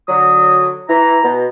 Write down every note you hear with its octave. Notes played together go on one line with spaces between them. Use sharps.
D3 F#3 D#6
E3 A#5
B2